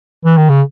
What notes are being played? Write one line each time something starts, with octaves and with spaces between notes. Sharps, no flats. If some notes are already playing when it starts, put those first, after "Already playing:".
E3
D#3
C#3